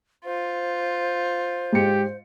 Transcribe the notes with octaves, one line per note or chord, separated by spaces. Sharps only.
F4 C5
G#2 G4 C#7